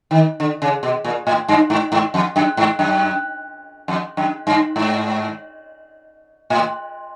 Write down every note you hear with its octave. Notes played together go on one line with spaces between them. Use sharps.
D#3
D3
C#3
B2
A#2
A2
G2
G#2
G#2
F2
F#2
G#2
F#2
F2
F#2
G2
G#2
A2